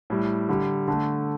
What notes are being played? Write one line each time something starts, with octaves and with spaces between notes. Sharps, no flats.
A2 G3
D3 G3
D3 A3